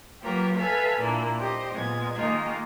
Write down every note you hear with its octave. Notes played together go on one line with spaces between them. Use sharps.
F#3 A#3 F4 G4 A#4 B4
A4 B4 E5 F5 G#5 A5
A#2 A#3 D4 E4
G4 C5 D#5
A#2 G#3 B3 G#6
D#3 G#3 A#3 D#4 F4